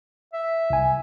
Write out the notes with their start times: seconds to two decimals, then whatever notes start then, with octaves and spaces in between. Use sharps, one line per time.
0.34 E5
0.70 C2 G#5